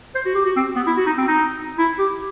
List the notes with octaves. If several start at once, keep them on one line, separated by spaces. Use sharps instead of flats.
C5
F#4
G4
F#4
C4
B3
E4
F#4
D#4
C4
D#4
E4
G4